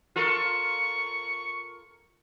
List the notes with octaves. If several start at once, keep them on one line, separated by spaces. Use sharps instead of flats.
F4 A4 A#4 C#6